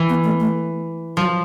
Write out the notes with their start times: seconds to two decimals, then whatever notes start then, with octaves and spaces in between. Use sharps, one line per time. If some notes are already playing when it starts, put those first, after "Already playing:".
Already playing: E3
0.09 B3
0.24 A3
0.40 A3
1.17 F3 F#3